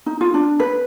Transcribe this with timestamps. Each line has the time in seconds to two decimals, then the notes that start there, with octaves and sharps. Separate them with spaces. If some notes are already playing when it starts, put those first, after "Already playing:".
0.06 D#4
0.21 F4
0.34 D4
0.60 B4